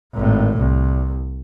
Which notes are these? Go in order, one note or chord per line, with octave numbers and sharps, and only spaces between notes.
G#1 A2
C2